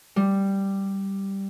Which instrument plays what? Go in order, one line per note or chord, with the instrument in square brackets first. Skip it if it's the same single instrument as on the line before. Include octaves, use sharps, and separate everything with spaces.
[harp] G3